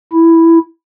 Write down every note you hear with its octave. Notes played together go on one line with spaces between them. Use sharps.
E4